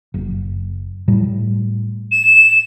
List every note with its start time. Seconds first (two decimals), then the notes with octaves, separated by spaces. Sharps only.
0.14 F#1
1.08 A2 G3
2.11 E7